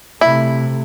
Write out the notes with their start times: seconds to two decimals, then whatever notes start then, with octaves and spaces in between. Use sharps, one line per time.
0.21 C3 A3 E4